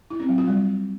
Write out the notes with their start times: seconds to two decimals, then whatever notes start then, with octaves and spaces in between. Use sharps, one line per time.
0.10 E4
0.20 C4
0.29 F#3
0.38 F4
0.47 G3